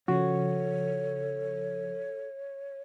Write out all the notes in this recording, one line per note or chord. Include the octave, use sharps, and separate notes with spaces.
C#3 F3 F#4 A4 C#5